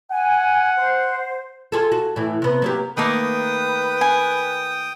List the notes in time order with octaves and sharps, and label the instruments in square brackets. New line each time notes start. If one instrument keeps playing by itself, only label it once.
[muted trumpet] F#5 [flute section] G#5
[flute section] C5
[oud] F4 G#4 A4
F#4
A2 E3
C3 B3
F#3 A#3 G4
[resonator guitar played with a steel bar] D#3 A3 A#3 [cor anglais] B4 [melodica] G5 D#6
[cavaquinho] G#5